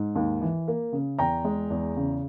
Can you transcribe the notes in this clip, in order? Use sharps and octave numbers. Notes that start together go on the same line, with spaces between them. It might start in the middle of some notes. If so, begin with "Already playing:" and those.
Already playing: G#2
D#2
E3
A#3
C#3
E2 G5 A#5
G#3
E2
C#3